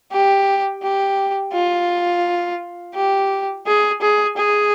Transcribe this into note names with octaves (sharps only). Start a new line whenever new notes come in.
G4
G4
F4
G4
G#4
G#4
G#4